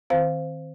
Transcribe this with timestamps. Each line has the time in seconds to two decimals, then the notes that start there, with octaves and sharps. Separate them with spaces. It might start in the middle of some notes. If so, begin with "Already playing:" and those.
0.10 D#3 C4 C5 F5